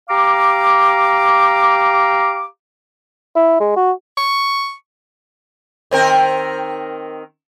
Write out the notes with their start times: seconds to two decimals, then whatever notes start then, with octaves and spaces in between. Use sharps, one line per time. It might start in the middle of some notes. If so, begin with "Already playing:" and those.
0.09 G4 F5 A#5 D6
3.36 E4
3.60 G#3
3.77 F#4
4.17 C#6
5.91 D#3 C4 A#4